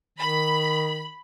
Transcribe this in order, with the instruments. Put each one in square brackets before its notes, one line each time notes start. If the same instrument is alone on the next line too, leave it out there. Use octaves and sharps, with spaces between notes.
[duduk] D#3 [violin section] B5